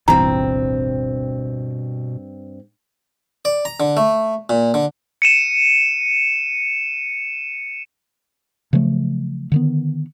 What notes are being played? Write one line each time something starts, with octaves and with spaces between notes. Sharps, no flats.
D1 G1 G2 B2 E3 C4 A#5
D5
A#5
D3
A3
A#2
D3
C#7 D#7 E7
C#3 F3 F#3 A3
D3 D#3 B3